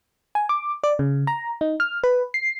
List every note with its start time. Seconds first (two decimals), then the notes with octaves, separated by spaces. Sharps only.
0.35 G#5
0.49 D6
0.84 D5
0.99 C#3
1.27 A#5
1.61 D#4
1.80 F6
2.04 B4
2.34 C7